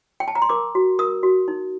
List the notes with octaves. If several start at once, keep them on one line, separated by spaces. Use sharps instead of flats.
G5
A5
A#5
C6
A#4 D6
F#4
A#4 D#6
F#4
D#4